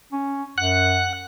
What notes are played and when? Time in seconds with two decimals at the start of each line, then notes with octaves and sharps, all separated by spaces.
0.12 C#4
0.58 F#2 F#5 F#6